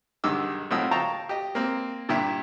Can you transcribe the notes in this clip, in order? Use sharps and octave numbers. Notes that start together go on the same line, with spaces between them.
B1 G2 D#3 G#3 D6 E6
B1 A2 C4 F4 D#6 E6
F5 G5 A5 A#5 C#6
G4 D#5
A#3 C4
G2 A#2 E4 G4 E5